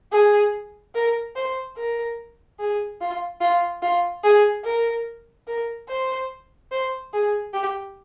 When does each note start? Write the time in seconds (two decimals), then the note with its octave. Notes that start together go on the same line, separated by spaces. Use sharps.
0.12 G#4
0.95 A#4
1.35 C5
1.77 A#4
2.59 G#4
3.01 F4
3.41 F4
3.82 F4
4.24 G#4
4.65 A#4
5.47 A#4
5.89 C5
6.71 C5
7.13 G#4
7.53 G4